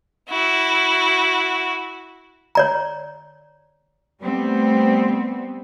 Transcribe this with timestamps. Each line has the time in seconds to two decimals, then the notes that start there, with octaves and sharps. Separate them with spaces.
0.29 E4 F#4
2.55 C#5 D5 A#5
4.22 G3 A3 B3 C4